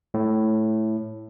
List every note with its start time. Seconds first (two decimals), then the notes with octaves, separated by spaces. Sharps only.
0.14 A2